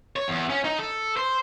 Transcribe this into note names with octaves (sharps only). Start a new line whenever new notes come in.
C#5
E2
C#4
D#4
A4
C5